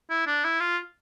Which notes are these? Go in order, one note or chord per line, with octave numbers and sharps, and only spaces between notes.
E4
D4
E4
F4